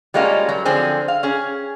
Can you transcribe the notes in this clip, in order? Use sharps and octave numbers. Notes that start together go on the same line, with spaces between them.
G3 G#3 A#3 C#4 F4 F#4
F#3
D3 F3 C4 G#4
F5
C#4 G#4